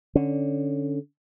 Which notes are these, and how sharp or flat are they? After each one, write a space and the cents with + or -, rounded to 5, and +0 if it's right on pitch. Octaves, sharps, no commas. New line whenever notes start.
D3 +0 C#4 +0